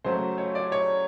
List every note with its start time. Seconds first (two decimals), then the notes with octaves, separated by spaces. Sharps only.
0.05 C#3 F#3 A3 C5
0.38 C#5
0.55 D5
0.72 C#5